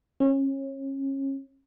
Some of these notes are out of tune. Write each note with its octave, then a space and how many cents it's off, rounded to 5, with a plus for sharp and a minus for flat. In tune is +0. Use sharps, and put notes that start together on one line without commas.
C#4 -30